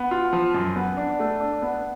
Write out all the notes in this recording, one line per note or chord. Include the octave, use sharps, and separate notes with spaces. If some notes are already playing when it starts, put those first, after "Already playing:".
Already playing: B3
F4
F3
F#2
B3
D4
A3
D4
B3